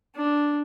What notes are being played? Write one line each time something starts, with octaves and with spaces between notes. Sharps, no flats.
D4